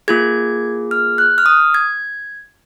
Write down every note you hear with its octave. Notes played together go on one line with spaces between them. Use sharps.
A#3 F4 G#4 G#6
F6
F#6
F6
D#6
G#6